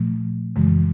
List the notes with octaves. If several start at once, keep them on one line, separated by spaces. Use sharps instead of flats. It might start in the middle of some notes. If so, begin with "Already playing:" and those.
Already playing: A#2 F3 A3
F#2 C#3 E3 G#3